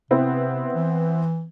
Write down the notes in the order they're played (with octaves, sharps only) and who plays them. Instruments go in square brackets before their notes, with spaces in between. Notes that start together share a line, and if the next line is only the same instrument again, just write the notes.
[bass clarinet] C3 [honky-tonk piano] B3 C4 E4
[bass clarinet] E3